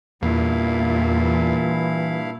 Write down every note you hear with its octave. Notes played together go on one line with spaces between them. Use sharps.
E2 G2 A#2 E4 F5
E3